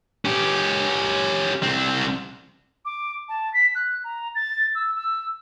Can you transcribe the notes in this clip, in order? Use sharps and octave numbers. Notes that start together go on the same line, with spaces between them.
C#4 G4
C2 C4
D6
A5
B6
F#6
A#5
A6
E6
E6